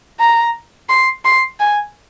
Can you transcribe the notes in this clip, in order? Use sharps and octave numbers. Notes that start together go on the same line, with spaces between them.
A#5
C6
C6
G#5